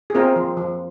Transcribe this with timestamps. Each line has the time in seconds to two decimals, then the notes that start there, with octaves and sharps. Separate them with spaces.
0.10 G#4
0.15 C4 F4 A#4
0.36 F3
0.57 F3